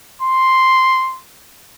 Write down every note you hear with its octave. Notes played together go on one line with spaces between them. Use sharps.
C6